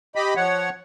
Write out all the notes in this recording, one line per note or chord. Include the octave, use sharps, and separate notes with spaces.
G4 D#5 B5
F3 C#5 F#5